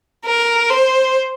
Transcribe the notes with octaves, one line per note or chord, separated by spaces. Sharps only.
A#4
C5